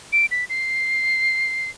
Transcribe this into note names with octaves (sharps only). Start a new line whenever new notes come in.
D7
B6
C7